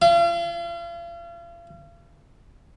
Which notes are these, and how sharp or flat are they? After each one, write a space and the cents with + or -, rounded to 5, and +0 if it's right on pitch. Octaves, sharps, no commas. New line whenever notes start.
F4 -40